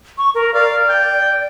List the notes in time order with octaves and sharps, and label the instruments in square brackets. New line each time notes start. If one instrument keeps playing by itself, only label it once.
[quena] C#6
A#4
[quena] D5 [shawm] F5
[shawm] G5